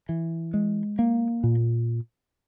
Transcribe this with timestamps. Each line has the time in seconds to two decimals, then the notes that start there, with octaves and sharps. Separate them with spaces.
0.09 E3
0.54 G#3
0.99 A#3
1.44 A#2